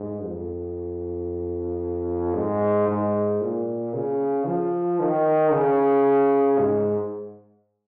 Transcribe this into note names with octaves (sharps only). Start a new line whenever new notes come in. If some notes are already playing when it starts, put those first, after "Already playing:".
Already playing: G#2
F2
G#2
G#2
A#2
C#3
F3
D#3
C#3
G#2